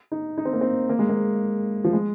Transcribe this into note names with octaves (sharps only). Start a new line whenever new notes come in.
D#4
D#4
C4
A#3
C4
A#3
G#3
A#3
F3
G#3